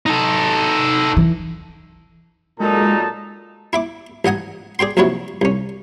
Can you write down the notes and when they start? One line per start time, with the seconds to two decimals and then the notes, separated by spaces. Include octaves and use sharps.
0.06 D#4 A4
1.17 E3
2.60 A#2 F#3 G#3 D#4 A4 A5
3.73 E4 E5 D6
4.25 A1 D#5 F#5 G#5 D#6
4.79 G#4 D5 G5 C6
4.97 A#1 C3 F#3 E4 F#4 C#5
5.42 C2 C#4